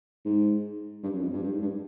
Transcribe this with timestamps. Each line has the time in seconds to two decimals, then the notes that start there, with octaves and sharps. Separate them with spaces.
0.25 G#2
1.03 G2
1.13 F#2
1.22 F2
1.33 G2
1.43 G2
1.52 G#2
1.62 G2